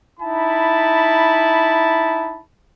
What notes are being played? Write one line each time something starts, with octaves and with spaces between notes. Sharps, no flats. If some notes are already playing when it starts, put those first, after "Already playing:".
D#4 E4 A5 B5